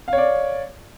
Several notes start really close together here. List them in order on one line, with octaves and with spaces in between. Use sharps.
F5 C#5 D5